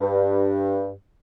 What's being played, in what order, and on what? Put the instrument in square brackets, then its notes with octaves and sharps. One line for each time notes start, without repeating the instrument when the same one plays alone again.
[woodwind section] G2